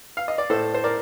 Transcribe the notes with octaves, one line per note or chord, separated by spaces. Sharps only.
F5
D#5
D5
A2 A4 C5
C5
A#4 D5